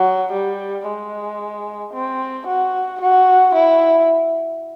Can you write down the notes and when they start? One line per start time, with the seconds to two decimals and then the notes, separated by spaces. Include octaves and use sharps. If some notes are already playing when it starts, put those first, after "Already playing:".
Already playing: F#3
0.32 G3
0.86 G#3
1.94 C4
2.47 F#4
3.01 F#4
3.55 E4